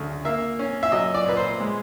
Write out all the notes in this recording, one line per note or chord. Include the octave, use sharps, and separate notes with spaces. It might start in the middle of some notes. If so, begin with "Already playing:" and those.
Already playing: D2 C#3
A#3 E5
C#4
E5
F#3 D#5
D5
A#2 B4
C5
G#3